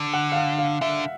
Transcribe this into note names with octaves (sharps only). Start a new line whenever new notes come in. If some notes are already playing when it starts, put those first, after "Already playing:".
Already playing: D3
F#5
F5
F#5
F5
D3 E5